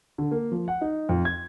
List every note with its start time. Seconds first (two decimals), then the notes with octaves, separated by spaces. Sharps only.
0.18 D3
0.31 A#3
0.52 F3
0.68 F#5
0.81 D#4
1.09 F2
1.25 G#6